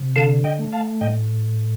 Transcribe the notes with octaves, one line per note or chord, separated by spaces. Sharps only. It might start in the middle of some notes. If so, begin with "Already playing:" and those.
Already playing: C3
D3 F5 A5
D#5 G5
A3
F5 A5
A2 D#5 G5